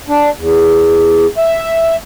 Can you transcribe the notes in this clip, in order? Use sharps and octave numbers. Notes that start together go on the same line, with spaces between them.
D4
E2
E5